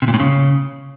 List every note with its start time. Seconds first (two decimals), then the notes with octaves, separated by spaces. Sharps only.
0.02 C3
0.08 A#2
0.14 A2
0.20 C#3